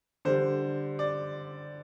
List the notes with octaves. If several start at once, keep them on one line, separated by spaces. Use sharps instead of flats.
D3 G3 C5
D5